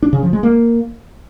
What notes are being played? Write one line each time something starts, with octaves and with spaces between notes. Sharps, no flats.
D4
C#3
F3
G#3
A#3